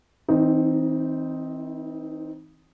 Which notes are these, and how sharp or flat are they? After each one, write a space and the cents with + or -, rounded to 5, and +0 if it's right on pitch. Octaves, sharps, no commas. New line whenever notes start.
E3 -35 C4 +0 D#4 +0